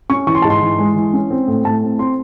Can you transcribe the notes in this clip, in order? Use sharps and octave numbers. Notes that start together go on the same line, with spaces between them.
C#4 C#6
E3 C#6
C6
G#2 A5
C6
E3
G#3
E3
C#4
C4
A2
A2 A5
C4
C4 C6